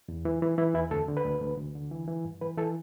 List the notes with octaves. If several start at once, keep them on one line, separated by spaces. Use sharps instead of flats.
E2
E3
E3
E3 E4
E2 E4
D2 A4
D3
B4
D2
D2
D2
D3
E3
E3
G2
E3 B4
E3 A4